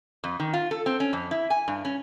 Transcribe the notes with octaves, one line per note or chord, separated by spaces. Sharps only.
F2
D#3
F4
A4
C4
C#4
F2
E4
G#5
G2
C#4